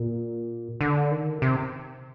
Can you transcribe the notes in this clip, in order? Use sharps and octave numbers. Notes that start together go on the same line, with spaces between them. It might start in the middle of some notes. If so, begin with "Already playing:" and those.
Already playing: A#2
D3
D#3
C3